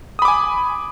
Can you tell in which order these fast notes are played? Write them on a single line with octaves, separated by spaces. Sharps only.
D#6 B5 D6 G#5